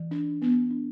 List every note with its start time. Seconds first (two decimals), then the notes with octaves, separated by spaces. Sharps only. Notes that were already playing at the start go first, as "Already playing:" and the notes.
Already playing: E3
0.11 D4
0.42 B3
0.71 D4